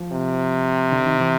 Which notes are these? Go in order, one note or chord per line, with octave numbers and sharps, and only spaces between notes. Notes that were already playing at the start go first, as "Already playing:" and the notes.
Already playing: F3
C3
D3
D#3
E3